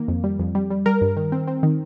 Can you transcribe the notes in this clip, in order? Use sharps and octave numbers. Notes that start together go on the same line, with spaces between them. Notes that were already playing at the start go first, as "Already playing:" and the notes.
Already playing: D#3 A#3
F2
G3
F2
G3
G3
G3 A#4
G2
D#3
C4
C4
D#3